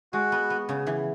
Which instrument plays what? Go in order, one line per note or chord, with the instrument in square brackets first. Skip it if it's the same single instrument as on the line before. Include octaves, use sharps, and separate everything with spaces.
[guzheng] G#3 [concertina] F#4
[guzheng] B3
B3
C#3
E3